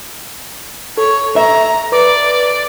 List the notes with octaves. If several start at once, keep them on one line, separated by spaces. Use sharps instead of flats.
A4 C#5
E5 A#5
B4 D5 D6